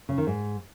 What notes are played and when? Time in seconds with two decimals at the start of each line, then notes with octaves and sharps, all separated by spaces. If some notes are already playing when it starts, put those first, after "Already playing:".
0.09 C#3
0.18 D#3
0.27 G#2